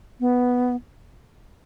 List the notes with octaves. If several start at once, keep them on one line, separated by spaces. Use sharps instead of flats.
B3